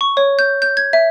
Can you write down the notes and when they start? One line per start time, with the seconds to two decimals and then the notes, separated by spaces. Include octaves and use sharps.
0.01 C#6
0.17 C#5
0.39 G6
0.62 G6
0.77 G#6
0.93 E5